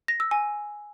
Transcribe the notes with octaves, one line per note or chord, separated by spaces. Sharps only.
A#6
E6
G#5